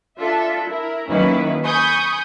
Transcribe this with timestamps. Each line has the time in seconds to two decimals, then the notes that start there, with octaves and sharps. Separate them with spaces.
0.19 D4 F4 A4 E5
0.67 E4 A#4
1.09 D#3 F#3 A#3 C#4 E4 B4
1.64 G#5 B5 C#6 D#6 G6